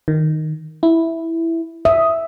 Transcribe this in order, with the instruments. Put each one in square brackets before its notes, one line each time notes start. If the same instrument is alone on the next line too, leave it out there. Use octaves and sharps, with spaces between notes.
[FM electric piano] D#3
E4
[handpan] E5 [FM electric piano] D#6